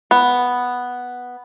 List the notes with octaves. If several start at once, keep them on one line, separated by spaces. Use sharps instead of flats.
B3